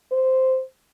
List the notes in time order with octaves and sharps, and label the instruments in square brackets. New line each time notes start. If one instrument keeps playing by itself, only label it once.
[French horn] C5